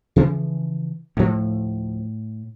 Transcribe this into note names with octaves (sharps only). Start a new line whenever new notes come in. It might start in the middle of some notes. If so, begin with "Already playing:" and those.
C#3 E3 F3
D2 A2 F3